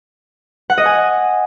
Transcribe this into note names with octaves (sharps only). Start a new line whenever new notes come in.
F#5
D#5
G#5